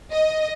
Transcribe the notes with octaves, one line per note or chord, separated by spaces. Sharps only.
D#5